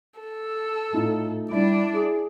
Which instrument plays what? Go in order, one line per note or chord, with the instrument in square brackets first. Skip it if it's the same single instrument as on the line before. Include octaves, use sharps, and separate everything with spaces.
[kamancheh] A4
[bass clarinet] A2 [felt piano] A3 D#4 F4
[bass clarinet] G3 [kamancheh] D4 D5 [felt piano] E4
[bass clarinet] G#4